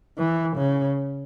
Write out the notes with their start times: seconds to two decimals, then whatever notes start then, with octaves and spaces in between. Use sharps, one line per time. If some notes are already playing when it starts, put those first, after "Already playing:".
0.17 E3
0.56 C#3